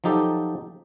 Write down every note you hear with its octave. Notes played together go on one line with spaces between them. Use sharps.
F3 F#3 D#4 G4 A4